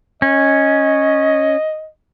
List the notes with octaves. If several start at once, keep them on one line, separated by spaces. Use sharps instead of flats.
C#4 D#5